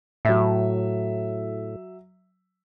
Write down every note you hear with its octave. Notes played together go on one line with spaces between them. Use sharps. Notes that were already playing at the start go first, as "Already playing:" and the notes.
A2 F#3 E5